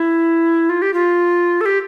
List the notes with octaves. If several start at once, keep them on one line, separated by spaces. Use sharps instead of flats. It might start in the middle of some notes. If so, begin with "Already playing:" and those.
Already playing: E4
F4
G4
F4
A4
G4